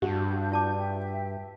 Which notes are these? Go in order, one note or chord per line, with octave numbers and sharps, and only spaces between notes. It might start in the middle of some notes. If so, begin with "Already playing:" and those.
G2 D4 F#4 G6
F4 A5 D6
E5 G5